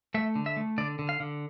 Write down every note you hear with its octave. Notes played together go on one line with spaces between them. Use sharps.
A3 E5
D3
E5
A3
D3 D5
D3
F5
D3